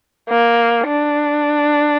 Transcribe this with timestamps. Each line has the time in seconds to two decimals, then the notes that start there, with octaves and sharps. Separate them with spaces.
0.29 A#3
0.87 D4